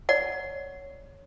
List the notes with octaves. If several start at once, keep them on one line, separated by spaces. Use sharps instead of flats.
C#5 D5 F#5